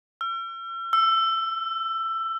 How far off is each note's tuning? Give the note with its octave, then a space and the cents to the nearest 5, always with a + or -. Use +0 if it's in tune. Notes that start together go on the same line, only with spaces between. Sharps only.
E6 +45
E6 +20